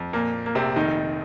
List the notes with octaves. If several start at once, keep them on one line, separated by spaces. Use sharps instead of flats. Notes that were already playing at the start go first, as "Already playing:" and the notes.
Already playing: F2
A#2 A#3
A#2
A#3
A#1 C3 C4
F1 D#3 D#4
F1